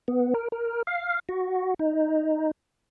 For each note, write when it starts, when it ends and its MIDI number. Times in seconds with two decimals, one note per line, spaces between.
0.08 0.34 59
0.34 0.48 70
0.52 0.82 70
0.87 1.19 77
1.29 1.74 66
1.79 2.51 63